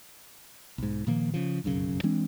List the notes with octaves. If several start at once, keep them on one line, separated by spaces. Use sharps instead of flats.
B1 G#2
A#2 D#3 F3 A#3
C#3 F3
F1 B1 F#2 C#3
E3 G#3 C4 D4